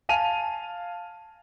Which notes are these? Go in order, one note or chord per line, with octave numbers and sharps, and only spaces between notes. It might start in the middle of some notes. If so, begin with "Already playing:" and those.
F5 G#5 A5 D#7 F7